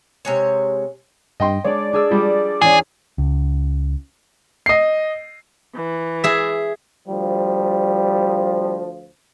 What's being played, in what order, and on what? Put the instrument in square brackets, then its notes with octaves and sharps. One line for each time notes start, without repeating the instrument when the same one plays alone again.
[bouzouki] C3 G#3 C#5
[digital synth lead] G2 [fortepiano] D#5 G5 C6
[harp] G#3 D4 [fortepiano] C#5 [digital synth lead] D5
[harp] D4 G#4 E6
[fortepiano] F3 G3
[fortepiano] E2 C#4 [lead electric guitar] G#4
[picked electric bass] C#2
[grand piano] D#5 C7
[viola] E3
[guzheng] G#4 E5
[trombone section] D2 F3 [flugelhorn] G3